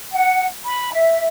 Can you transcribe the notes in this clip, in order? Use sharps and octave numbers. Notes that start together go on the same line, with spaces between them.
F#5
B5
E5